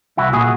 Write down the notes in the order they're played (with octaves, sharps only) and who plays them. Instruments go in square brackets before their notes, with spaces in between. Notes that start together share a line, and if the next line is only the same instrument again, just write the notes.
[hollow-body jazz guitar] C2 [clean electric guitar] E4 F#4
[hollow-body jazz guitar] A#2 [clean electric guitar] F#4 G#4